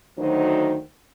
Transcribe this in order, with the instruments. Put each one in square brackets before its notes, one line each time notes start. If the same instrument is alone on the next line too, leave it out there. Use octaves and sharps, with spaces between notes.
[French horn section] D2 D#3 F#3 D#4 C5